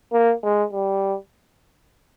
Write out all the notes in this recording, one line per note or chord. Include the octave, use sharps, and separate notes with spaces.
A#3
G#3
G3